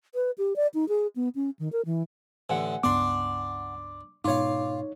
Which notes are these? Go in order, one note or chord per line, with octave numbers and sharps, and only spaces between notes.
B4
G4
D5
D#4
G#4
B3
C#4
D#3
A#4
E3
A1 D3 F#5 G#5
C#2 G2 B3 D4 D5 C6 D6
G#2 B2 D#4 F4 C#5 F5 D6